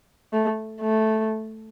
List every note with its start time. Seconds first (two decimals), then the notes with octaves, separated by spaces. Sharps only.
0.33 A3
0.81 A3